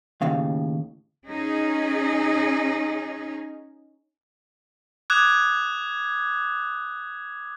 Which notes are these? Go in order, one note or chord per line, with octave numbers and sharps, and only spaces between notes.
D#2 A2 C#3 F5
C#4 D#4 G#4
D6 D#6 F#6 G#6